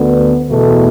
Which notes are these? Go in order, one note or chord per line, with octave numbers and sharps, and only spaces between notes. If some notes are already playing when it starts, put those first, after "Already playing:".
Already playing: D2 D3 B3
E2 B2 A3 F#4 A4